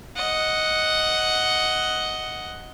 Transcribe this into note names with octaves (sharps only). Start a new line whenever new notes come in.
D#5 F#5